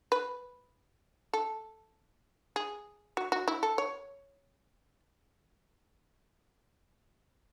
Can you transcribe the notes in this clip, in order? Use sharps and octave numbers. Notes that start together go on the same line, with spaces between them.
B4
A4
G#4
F#4
F#4
E4
A4
C#5